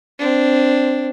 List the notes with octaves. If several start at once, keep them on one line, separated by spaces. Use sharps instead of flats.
C4 D4